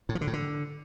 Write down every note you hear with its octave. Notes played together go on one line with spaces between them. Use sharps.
A2
F3
D3
A2
D3